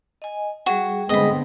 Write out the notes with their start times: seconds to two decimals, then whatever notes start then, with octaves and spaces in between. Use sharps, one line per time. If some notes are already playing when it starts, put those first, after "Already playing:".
0.22 D#5 G#5
0.66 G3 F#4 G#4 G5
1.09 D3 G#3 B3 C4 D#5 B5